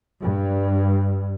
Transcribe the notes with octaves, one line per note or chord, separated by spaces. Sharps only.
G2